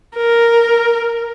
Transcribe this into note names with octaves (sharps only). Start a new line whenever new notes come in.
A#4